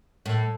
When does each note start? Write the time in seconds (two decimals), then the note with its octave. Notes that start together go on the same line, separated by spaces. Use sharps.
0.26 A2